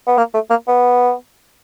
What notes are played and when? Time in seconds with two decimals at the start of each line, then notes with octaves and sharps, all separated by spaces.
0.07 B3
0.18 A#3
0.34 A3
0.50 A#3
0.68 B3